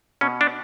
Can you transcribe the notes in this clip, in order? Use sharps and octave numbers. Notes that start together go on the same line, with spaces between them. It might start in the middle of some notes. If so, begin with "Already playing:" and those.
B2 C#4
D4